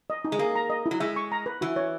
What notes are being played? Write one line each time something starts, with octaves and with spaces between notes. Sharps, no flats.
D#5
D#4
G#3
A#3 G#4
A#5
D#5
E4
F#3
G#3 E5
C#6
A#5
B4
E3 F#4
C#5